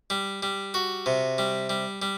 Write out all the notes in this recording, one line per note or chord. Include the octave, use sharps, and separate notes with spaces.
G3
G3
F#4
C3
G3
G3
G3